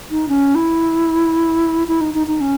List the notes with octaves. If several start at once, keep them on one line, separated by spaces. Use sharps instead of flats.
D#4
C#4
E4
E4
D#4
D#4
D#4
C#4